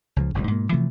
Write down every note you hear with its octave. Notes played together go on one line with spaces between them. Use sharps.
C#2 C#3 F3
F#1 C#2 A2 C3
G#2 B2 A#3
C3 E3 F3 A3